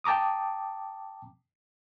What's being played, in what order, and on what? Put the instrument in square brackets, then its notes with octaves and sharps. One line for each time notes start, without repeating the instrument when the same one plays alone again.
[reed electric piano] G5 A5 A#5 D6 D#6